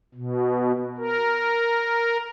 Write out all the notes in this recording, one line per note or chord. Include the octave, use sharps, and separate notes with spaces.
B2
A#4